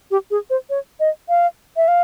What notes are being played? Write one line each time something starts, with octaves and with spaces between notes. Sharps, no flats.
G4
G#4
C5
C#5
D#5
F5
E5
F5